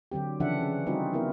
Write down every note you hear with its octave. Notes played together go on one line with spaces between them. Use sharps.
D3 F#3 C4 G4
C#3 E3 F3 D4 E5 F#5
C#4
G3 C4 D#4 F4 F#4 B4
B3 E4 A#4